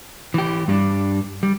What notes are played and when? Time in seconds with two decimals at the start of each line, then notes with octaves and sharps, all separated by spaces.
0.34 E3 G4
0.68 G2 G3 D4
1.43 G3